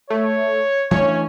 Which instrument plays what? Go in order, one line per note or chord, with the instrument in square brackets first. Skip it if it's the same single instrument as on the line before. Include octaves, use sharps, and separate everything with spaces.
[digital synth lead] A3 [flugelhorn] C#5
[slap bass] E3 A3 D4 [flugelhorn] C#4 [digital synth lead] C#5